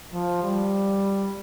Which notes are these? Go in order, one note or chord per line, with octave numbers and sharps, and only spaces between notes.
F3
G3